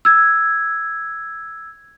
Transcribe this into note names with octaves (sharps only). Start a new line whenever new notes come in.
E6 G#6